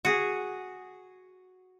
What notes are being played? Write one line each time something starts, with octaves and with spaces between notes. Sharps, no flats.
F#4 G#4